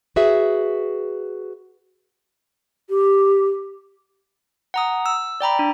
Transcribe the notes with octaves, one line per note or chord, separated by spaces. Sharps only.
F#4 G#4 B4 E5
G4
F#5 A#5 D#6
E6
D5 G5 A#5 B5
D4